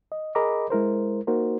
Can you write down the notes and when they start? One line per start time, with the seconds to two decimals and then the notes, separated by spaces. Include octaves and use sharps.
0.12 D#5
0.35 G#4 A#4 D#5 A#5 B5 D6
0.70 G#3 E4 A#4 C5
1.27 A#3 D#4 F#4 A#4 C5